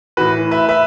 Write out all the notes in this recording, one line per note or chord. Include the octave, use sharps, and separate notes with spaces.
A2 E3 F#4 B4
B4 E5
B4 E5